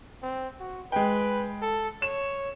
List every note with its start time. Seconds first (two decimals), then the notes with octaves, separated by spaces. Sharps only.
0.22 C4
0.60 F#4
0.92 G#3 B4 G5
1.62 A4
2.02 C#5 E7